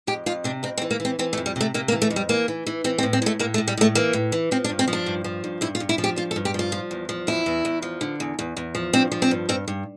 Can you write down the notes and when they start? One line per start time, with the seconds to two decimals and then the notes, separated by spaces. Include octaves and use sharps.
0.07 F2 G4
0.26 F2 F4
0.44 C3 D4
0.63 F2 C4
0.77 C4
0.82 E3
0.91 A#3
1.00 E3
1.05 C4
1.19 E3 C4
1.33 A3
1.37 F2
1.46 G3
1.56 C3 A3
1.74 C3 A#3
1.88 A#3
1.92 E3
2.02 A3
2.10 F2
2.16 G3
2.29 E3 A#3
2.48 E3
2.67 E3
2.84 E3 C4
2.98 C4
3.03 A2
3.13 C4
3.22 A2 A3
3.39 A2 A#3
3.54 A3
3.58 A2
3.68 G3
3.77 A2 A3
3.95 E3 A#3
4.13 A2
4.32 E3
4.51 F3 C4
4.64 D4
4.69 G2
4.79 C4
4.88 F3
4.93 D4
5.06 G2
5.24 F3
5.44 G2
5.61 G2 E4
5.75 F4
5.80 G2
5.89 E4
5.98 F3
6.04 G4
6.16 G2 F4
6.31 A4
6.36 G2
6.45 G4
6.54 F3 F4
6.72 F3
6.91 E2
7.09 F3
7.27 E2 E4
7.46 E2
7.65 E2
7.82 F3
8.01 D3
8.20 E2
8.39 E2
8.57 E2
8.75 F3
8.93 G2 C4
9.12 F3
9.22 C4
9.31 G2
9.49 G2 C4
9.68 G2